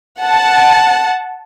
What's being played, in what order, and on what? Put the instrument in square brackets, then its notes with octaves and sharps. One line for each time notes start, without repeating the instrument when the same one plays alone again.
[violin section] F#5 A5